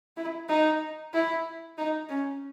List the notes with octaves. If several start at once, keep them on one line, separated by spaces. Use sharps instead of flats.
E4
D#4
E4
D#4
C#4